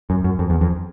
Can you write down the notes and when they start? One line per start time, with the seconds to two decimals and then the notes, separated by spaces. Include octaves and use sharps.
0.10 F#2
0.24 F#2
0.39 F2
0.50 E2
0.61 F2